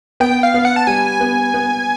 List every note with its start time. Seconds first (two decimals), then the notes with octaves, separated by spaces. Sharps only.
0.20 B3 G5
0.43 F5
0.54 B3
0.65 F#5
0.76 A5
0.87 G3 G#5
1.21 B3
1.54 B3